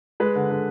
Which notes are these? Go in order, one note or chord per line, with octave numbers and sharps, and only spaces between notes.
G#3 B4
D3
D3